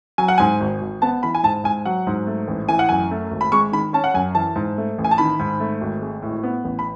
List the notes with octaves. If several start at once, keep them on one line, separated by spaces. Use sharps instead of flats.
F#3 G#5
F#5
G#2 G#5
G#1
G#1
B3 A5
E3 B5
G#5
G#2 A5
G#2 G#5
F#3 F#5
G#2
A3
A1
E3 G#5
F#5
F#2 G#5
A3
G#1
B5
G#3 C#6
D#3 B5
C#4 A5
F#5
F#2 G#5
E3 A5
G#2
A3
A1
G#5
A5
D#3 B5
G#2
A3
G#1
G#3
A2
B3
A1
B5